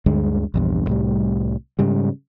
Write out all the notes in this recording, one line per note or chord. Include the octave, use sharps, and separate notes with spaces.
D2 G2 D3 G#3
A#1 E2 G2
C2 A2 G3
G#2 C#3 G3